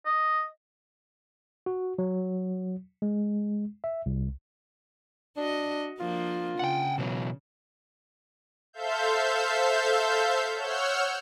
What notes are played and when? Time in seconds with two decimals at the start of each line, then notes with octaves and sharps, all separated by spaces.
0.06 D#5
1.66 F#4
1.99 F#3
3.02 G#3
3.84 E5
4.06 C2
5.37 D4 F#4 D#5
6.00 F3 A#3 D4 F4
6.59 C#3 F#5 G5
6.98 B2 E3 F#3
8.73 A4 C5 E5 F5 G6
10.55 C#5 F#5 E6 F6 G6